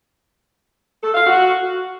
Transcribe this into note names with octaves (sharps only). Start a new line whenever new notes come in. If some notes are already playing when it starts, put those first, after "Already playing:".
A4
F5
F#4